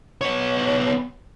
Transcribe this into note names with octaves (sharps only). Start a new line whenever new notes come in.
B3 C#5